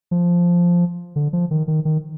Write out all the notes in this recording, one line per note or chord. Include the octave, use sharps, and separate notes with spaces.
F3
D3
F3
D#3
D#3
D#3